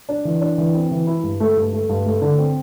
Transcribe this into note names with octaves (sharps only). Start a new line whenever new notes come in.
D4
E3
D4
E3
C4
E3
E4
G2
A3
G2
A3
G2
A3
D3
C4